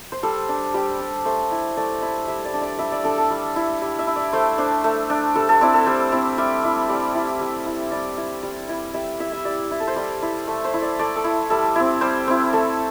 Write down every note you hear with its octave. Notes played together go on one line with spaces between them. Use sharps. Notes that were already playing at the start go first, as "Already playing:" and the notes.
C5
G3 A4
D4
G3 G4
D4
A3 C5
E4
A3 D5
E4
G3 E5
D5
D4
D5
G3 E5
D5
D4 A4
A4
G3
E4
G3
E5
E4
D5
A3 C5
D4 C5
A3
D4
G3 A4
A4
C4 E4 D5
A4
G3 C5
C4 E4
G3 E5
E4
G3 D5
E4
G3
E4
G3 D5
E4
G3
E4
G3 E5
E4 E5
E5
G3 D5
E4
A4
C5
G3 D5
E4
A3
C5
E4
D5
A3 D5
A4
E4
G3 A4
C4 E4
G3 C5
C4 E4
A3 A4